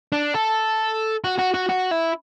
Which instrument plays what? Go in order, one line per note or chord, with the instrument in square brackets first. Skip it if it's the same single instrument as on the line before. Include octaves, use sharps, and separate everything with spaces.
[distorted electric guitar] D4
A4
F#4
F#4
F#4
F#4
E4